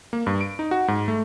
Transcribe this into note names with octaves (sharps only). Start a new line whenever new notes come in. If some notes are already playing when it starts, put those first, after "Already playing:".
A#3
G2
D7
D#4
F#4
G#2
A3